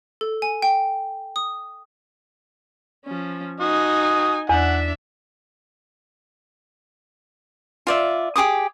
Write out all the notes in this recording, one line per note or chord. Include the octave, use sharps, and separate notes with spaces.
A4
G#5
G5
D#6
F3 C#4
D#4 F#4 G#5 D#6
E2 D4 E5 F#5
F4 D5 E5
G4 G#4 D6 D#6